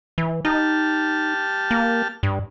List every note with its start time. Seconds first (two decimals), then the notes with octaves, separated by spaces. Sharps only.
0.18 E3
0.45 D#4 G4 A5 F6
1.71 A#3
2.23 G2